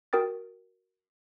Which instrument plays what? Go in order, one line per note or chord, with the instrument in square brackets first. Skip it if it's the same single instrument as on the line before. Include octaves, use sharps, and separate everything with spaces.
[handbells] F#4 A#4 G5 D#6 A6